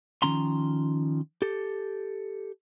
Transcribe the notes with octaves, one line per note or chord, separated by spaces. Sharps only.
D#3 F3 C#4 A#5 C6
G4 A4